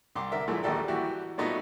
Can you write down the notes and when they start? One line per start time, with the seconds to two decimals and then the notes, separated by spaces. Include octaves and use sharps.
0.15 C2 C6 D6
0.32 D3 A#4 E5
0.48 A#2 E3 G#3 A3
0.63 A#1 D#2 G#2 G3 A4 G5
0.88 E3 E4 F#4 G4
1.38 A#2 G3 A3 B3 D#4 F#4